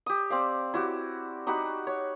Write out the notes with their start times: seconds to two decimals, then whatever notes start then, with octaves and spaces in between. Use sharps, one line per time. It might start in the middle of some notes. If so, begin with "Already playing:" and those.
0.06 G4 D#6
0.30 C4 D5 F5
0.74 E4 F#4 G4
1.47 D#4 F#4 G4 B5
1.87 C#5